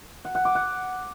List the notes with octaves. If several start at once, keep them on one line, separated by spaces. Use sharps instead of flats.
F#5
F#5
D6
F#5